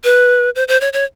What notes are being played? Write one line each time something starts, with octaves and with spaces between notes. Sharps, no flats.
B4
C5
C5
C#5
C#5